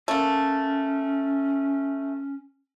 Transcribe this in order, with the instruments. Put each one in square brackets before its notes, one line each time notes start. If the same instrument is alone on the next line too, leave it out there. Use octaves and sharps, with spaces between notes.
[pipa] A3 A#3 [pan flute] C#4